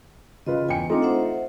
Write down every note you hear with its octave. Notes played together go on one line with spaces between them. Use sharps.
C#3 F4 B4 D#5
E2 G5 G#5 C#7
A3 C4 D4 D#4 F4
C5 E5 F#5